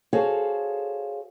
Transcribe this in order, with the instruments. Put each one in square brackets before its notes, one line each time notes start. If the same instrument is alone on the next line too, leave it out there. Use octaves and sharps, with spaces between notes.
[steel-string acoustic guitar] F#4 G#4 A4 C5 C#5 F5